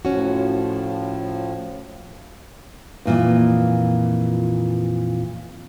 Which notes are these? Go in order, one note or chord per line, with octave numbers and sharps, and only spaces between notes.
A2 F3 C#4 F#4
F2 A#2 E3